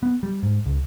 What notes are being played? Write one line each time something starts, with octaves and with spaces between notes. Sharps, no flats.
B3
G3
G#2
C#2